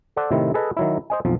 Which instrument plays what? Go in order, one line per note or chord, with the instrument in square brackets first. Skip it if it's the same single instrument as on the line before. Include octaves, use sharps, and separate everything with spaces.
[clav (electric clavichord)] A4 C5 D5 F#5 A5
A2 C3 D#3 C4 E4
G#4 A4 B4 D#5
D#3 F#3 E4
C5 D#5 G#5
B1 F2 F3